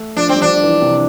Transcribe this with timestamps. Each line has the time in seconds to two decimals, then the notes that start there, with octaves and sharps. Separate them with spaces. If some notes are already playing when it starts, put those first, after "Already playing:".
Already playing: A3
0.17 F3 D4
0.29 C4
0.35 G3
0.42 F3 D4
0.63 E3
0.81 C3